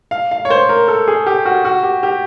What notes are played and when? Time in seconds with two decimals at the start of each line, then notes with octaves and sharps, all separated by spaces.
0.11 F5
0.31 F5
0.45 C#5
0.50 C5
0.69 A#4
0.88 A4
1.08 G#4
1.27 G4
1.46 F#4
1.65 F#4
1.83 G4
2.03 G4